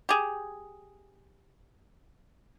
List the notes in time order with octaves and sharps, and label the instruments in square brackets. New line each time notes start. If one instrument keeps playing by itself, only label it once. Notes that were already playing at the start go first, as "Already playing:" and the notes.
[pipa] G4 G#4